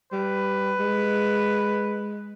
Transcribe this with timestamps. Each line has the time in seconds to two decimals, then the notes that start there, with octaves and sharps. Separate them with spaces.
0.12 G3 B4
0.79 G#3